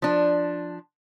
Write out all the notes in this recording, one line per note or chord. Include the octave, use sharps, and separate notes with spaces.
F3 D4